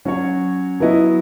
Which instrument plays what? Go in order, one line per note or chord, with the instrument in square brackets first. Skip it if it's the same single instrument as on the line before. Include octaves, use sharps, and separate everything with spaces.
[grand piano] F#3 C#4 F#4 C#5
F#3 B3 E4 B4 D#5